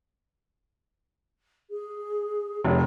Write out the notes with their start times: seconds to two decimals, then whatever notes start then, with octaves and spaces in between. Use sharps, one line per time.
1.70 G#4
2.65 F1 C#5